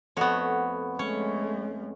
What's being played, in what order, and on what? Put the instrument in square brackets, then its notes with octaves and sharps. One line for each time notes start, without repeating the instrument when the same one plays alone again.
[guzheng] F2 A3 F#4 [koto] B3 C#5
[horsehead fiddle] G#3 A3 [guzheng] C#4 [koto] C#5